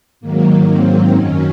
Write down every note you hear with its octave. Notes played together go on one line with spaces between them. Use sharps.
G#2 D#3 F#3 A#3
C4
F#2 D#3 F#3 C#4